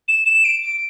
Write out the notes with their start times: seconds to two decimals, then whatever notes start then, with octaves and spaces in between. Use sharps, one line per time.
0.08 E7
0.26 E7
0.45 D7
0.63 D7